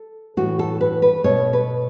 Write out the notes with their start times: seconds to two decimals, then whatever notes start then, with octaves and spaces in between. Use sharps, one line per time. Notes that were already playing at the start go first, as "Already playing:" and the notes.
Already playing: A4
0.37 A2 E3 A3 F#4
0.59 A4
0.81 B4
1.02 B4
1.24 B2 A3 C#5
1.53 B4